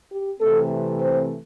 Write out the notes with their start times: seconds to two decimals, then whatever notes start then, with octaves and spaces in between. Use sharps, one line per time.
0.11 G4
0.41 C3 E3 A3 C4 A4
1.01 C5